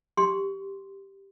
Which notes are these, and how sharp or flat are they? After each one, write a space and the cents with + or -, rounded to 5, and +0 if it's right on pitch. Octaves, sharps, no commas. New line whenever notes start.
G4 +0 C6 +0